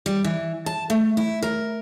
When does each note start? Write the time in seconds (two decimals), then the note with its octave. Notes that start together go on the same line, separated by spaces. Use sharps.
0.06 G3
0.24 E3
0.66 A5
0.90 A3
1.17 E4
1.42 A#4